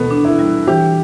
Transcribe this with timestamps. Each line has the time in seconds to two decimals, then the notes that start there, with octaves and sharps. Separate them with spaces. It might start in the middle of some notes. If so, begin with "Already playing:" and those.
Already playing: B2 B3 A4
0.11 D4
0.25 E4
0.39 G3
0.67 E3 G4